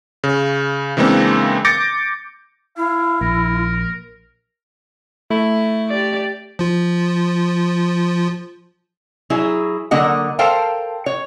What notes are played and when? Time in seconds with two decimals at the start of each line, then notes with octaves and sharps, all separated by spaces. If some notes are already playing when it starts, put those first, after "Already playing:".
0.24 C#3
0.97 C#3 E3 G#3 A#3 C4 D4
1.65 D6 G6 A6 A#6 C#7 D7
2.77 E4 F5
3.21 A#1 A#4
5.30 A3 E4
5.89 G4 D5
6.59 F3 F4
9.30 F#3 E4 G#4
9.91 D3 F#3 A#3 D#5 F#5
10.39 A4 A#4 C5 F5 G5 A5
11.06 C#5